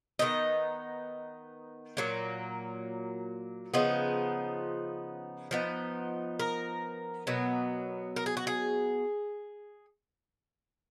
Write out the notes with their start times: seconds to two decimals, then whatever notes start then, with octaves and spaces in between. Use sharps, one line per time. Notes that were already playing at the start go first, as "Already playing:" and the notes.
0.19 D#3 F#3 B3 D#4 D#5
1.97 A#2 F#3 A#3
3.74 C#3 F3 B3 D#4
5.51 F3 B3 D#4
6.40 A#4
7.27 B2 F#3 B3
8.16 A#4
8.26 G#4
8.37 F#4
8.47 G#4